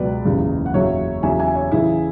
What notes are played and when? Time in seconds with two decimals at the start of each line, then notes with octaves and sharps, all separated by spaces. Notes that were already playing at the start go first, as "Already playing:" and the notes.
Already playing: C#2 B2 F#3 B4 D5
0.25 F#1 E2 C#3
0.66 F#5
0.74 F#1 E2 C#3 F#3 C#5 E5
1.23 E2 C#3 F#3 E5 G#5
1.39 E5 G#5
1.55 C#5 E5
1.71 E2 C#3 E3 E4 G#4